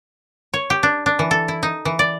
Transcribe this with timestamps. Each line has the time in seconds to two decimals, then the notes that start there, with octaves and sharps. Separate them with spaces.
0.54 C#5
0.70 G4
0.83 D4
1.06 D4
1.19 E3
1.31 A4
1.48 E4
1.63 D#4
1.85 E3
1.99 D5